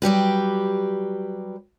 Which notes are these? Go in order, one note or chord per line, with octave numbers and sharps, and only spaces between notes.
F#3 G3 G4 B4